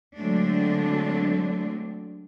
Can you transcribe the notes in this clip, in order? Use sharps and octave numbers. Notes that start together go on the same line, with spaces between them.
D3 F#3 G#3 A3 C4 D4